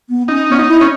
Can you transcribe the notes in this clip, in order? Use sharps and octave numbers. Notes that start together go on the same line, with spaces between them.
B3
C#4 D#4
B3 C#4
D#4
E4
C#4